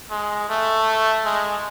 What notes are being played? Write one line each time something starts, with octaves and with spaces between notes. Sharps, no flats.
G#3
A3
G#3